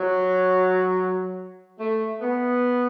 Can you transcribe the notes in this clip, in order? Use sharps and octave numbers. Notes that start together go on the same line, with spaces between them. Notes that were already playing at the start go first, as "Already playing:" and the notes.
Already playing: F#3
A3
B3